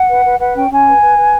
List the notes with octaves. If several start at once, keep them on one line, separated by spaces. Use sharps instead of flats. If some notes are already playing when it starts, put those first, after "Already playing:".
Already playing: F#5
B4
B4
B4 F#5
C#4 G5
C#4 G#5
B4
B4
B4